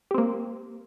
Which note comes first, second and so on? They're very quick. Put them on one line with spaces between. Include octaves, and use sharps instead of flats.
G4 C4 A#3